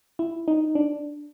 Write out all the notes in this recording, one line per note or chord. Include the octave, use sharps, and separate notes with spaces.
E4
D#4
D4